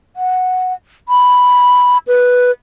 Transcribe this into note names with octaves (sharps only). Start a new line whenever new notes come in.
F#5
B5
B4